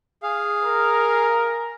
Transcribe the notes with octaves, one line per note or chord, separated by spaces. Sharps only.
G#4 F5
A#4